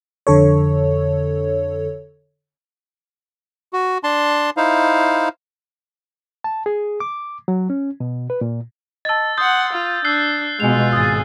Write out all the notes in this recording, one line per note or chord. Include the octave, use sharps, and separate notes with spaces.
F2 D3 A4 C#5
F#4
D4 A5 C6
D#4 E4 C5 F5
A5
G#4
D6
F#3
C#4
B2
B4
A#2
D#5 A5 E6 A6
F#5 C6 D#6 G6
F4
D4 E6 F#6 C7
B2 G#3 F4 G#5 F7
G#1 G#4 D#6 A6